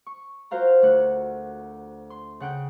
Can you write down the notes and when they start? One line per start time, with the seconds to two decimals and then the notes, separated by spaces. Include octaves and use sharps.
0.06 C#6
0.51 F4 F#4 A#4 C5 F5 A#5
0.82 D2 F#5
2.10 C6
2.40 C#3 F#5 G5